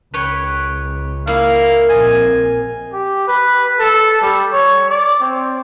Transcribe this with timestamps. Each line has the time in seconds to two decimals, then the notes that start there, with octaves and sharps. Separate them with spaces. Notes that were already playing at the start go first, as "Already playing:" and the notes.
0.14 C#2 B4 C#5 G5
1.27 A#3 E4 F5
1.89 A#1 C4 D#5 G#5
2.93 G4
3.28 B4
3.80 A4
4.21 G3
4.53 C#5
4.90 D5
5.21 C4